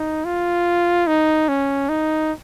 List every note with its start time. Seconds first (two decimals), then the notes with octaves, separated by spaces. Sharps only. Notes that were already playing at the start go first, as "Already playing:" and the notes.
Already playing: D#4
0.25 F4
1.07 D#4
1.49 C#4
1.89 D#4